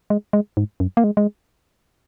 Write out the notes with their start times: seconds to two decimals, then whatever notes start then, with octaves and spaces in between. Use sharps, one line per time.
0.10 G#3
0.33 G#3
0.57 G#2
0.80 F#2
0.97 A#3
1.04 G#3
1.17 G#3